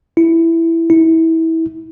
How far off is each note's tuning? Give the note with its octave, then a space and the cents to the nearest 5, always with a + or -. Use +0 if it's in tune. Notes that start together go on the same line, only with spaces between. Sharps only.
E4 +5
E4 -25